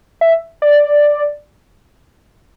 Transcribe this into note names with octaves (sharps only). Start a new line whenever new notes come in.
E5
D5